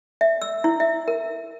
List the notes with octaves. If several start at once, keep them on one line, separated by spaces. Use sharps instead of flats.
E5
E6
E4
E5
A#4